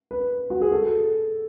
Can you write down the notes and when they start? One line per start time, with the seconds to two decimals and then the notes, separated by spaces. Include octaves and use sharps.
0.11 B4
0.50 F#4
0.61 G#4
0.72 A4